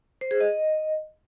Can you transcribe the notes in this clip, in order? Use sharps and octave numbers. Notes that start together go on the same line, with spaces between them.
C5
G#4
D#5